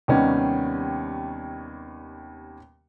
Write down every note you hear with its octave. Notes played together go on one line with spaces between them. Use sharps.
D#2 C3 D#3 G3 B3 C#4